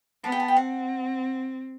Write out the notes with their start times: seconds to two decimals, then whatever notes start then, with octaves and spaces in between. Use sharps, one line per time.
0.24 B3 A5
0.32 G5
0.40 A5
0.48 G5
0.57 C4 F#5